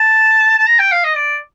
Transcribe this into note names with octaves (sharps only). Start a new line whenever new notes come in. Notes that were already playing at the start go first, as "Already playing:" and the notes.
Already playing: A5
A5
A#5
G5
F5
D#5
D5